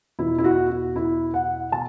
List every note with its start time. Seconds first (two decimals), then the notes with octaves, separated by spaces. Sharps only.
0.19 E2 B2 E4
0.38 E4
0.44 F#4
0.70 F#4
0.96 E4
1.34 F#5
1.72 B2 A5